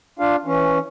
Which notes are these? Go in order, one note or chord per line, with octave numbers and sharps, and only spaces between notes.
D4 F4 F5
E3 C#4